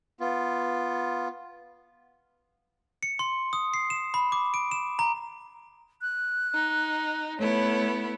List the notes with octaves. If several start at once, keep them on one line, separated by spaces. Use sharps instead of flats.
B3 F4
C#7
C6
D#6
C7
E7
B5
D6
D7
E7
A#5
F#6
D#4
A3 B3 E4 C#5